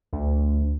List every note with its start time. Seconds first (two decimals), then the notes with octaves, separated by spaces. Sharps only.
0.13 D2